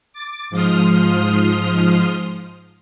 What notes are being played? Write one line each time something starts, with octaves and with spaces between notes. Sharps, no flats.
D6 A6
G#2 F3 C6 D#6 F6